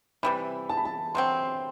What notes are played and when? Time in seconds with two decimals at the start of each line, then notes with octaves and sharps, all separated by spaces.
0.23 C3 E3 G3 B5
0.69 A5
0.77 B5
0.85 A5
1.15 C3 F#3 C4 C6